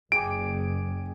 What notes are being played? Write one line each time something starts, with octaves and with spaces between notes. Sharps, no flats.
F#1 G#4 G5 D6 D7